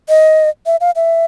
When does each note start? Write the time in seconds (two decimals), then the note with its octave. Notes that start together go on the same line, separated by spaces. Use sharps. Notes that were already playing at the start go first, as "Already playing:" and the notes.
0.09 D#5
0.66 E5
0.81 F5
0.96 E5